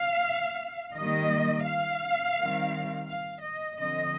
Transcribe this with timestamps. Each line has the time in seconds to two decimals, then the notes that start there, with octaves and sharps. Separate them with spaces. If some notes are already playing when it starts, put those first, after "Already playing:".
Already playing: F5
0.95 D#3 G3 A#3 D#5
1.66 F5
2.37 D#3 G3 C4
3.08 F5
3.44 D#5
3.79 D3 F3 C4 D#5